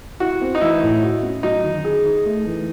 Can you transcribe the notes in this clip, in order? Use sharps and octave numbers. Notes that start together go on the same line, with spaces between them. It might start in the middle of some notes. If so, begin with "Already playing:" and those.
E4 F#4
C4
D#4
E3 E4
A2
F#4
C#4
F#3 D#4
D#3
G#4
D#4
A3
E3